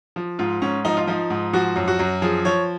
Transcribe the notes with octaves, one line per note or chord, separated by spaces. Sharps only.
F3
G#2 F4
G#2 C#4
F3 D#4
F4
F3 D#4
G#2
F3 F#4
F#2
F#4
F#2
F3 G#4
F3 C#5